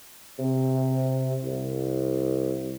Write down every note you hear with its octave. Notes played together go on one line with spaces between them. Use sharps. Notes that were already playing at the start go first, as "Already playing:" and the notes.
C3
C2